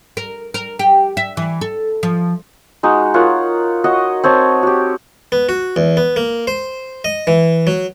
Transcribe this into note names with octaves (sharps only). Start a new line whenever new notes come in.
A#4
A#4
G4
E5
E3
A4
F3
G#3 D#4 F#4
F4 A#4 C#5 F#5
F#4 C#5 D#5
C4 C#5 D#5 A5
F#4 G4
B3
F#4
E2
B3
A#3
C5
D#5
E3
F#3